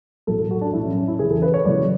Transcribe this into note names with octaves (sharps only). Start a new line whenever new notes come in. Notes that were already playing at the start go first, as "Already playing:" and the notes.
B1 A2 F#3 A4
A4
F#4
D4
B1 A2 F#3 E4
C#4
C#4
E4
E2 C#3 E3 G#4
A4
B4
C#5
F#1 F#2 C#3 E3 D5